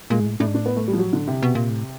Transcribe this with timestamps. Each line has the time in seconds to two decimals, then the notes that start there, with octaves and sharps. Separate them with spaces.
0.10 A#2 G#3
0.20 G#2
0.26 A2
0.40 A2 D4
0.47 G#2
0.54 A2 D4
0.66 B3
0.76 A3
0.88 G3
0.93 F3
0.98 F#3
1.13 D3
1.27 C3
1.43 B2
1.55 A#2
1.70 A2